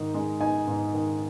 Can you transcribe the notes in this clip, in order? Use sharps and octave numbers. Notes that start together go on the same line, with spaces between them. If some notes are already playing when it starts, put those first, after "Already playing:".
Already playing: G#2 D#3 D#4
G#3
D#4 G#5
G#2
D#3